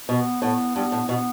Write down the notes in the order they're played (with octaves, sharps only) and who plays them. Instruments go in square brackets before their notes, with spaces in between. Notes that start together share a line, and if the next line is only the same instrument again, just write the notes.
[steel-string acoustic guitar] B2 [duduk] B3
[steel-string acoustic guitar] A2 [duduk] B3
[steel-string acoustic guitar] G2 [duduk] B3
[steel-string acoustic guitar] A2
[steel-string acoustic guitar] B2 [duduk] B3